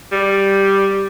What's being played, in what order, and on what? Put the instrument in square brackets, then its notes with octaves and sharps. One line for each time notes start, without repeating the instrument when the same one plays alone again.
[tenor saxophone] G3